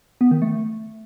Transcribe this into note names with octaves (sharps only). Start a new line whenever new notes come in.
B3
D#3
A3